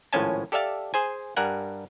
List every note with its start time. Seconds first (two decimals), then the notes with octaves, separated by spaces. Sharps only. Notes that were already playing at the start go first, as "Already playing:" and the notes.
0.13 G#1 A2 F3 C#4 G#5 A5
0.52 G4 A4 D5 E5 F5 A5
0.94 G#4 C5 G#5
1.36 G2 G3 A#4 F#5 G#5